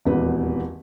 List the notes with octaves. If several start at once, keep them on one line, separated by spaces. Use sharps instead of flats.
D#1 G#1 E2 B4